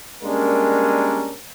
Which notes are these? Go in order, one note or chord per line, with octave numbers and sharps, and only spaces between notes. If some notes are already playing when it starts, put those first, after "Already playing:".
G3 G#3 A#3 C#4 D4 A#4